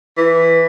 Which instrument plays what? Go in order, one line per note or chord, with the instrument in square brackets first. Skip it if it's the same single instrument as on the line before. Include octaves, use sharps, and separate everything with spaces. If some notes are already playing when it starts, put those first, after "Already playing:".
[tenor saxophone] E3